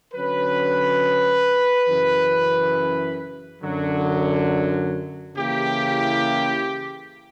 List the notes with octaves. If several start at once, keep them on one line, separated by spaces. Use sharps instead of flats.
D3 F#3 C#4 B4
F#2 C#3 E3
F#2 D3 F#3
C#3 E3 A#3 E4 G4